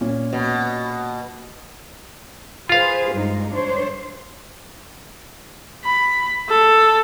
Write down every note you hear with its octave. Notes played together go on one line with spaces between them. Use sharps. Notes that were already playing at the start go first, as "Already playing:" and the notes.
A#2 C#4
B2
F4 G#4 B4 C5 F5
G2 G#3 D#4
D4 C5 C#5
B5
A4